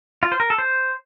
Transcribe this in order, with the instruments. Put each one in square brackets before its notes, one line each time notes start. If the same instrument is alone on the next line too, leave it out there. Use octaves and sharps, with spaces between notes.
[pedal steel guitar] F4
C5
A#4
A4
C5